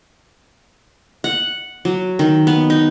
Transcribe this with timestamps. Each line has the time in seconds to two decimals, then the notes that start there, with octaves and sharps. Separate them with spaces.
1.24 F#5
1.85 F#3
2.19 D#3
2.47 B3
2.70 D#4